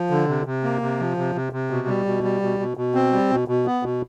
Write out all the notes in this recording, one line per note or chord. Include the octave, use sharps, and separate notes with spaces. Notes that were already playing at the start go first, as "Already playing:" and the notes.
Already playing: F3
D3
C3
C3
A#3
C3
F3
C3
C3
C3
B2
G3
B2
G3
B2
B2
B2
C4
G3
B2
B2
B3
B2